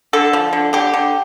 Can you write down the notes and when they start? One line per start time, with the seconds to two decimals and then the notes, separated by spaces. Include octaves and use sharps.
0.13 D3 A4
0.33 F3
0.53 D3
0.73 D3 G4
0.94 D3